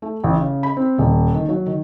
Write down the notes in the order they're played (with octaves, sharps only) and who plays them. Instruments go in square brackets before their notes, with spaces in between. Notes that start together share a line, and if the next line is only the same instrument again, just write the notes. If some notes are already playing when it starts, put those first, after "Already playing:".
[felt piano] A3
A1
C#3
B5
C4
D#1
D#3
F#3
D#3